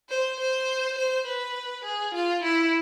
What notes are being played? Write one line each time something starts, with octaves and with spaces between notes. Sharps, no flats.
C5
C5
C5
B4
G#4
F4
E4